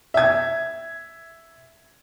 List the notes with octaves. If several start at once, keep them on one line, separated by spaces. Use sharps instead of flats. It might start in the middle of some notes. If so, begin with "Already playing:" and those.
E5 G#6